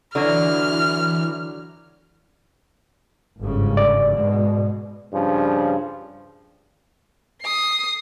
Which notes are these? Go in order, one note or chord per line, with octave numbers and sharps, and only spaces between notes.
D3 E3 F#3 F#4 F6
G1 G#2 C#3
D5
G#2 B2 G#3
G2 C#3 F3
D#6 C7